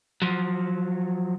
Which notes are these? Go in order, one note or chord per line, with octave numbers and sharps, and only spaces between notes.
F3 F#3